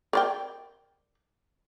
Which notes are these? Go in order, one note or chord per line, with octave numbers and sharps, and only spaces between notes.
A#4 D5 G5